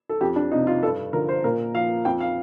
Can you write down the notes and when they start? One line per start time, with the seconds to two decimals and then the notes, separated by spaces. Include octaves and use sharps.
0.09 A4
0.21 F2 G4
0.36 D4
0.52 C3 F3 D#4
0.67 F4
0.82 G2 A4
1.13 D3 F3 A#4
1.29 C5
1.44 A#2 A#4
1.74 F3 F5
2.05 F2 G5
2.20 F5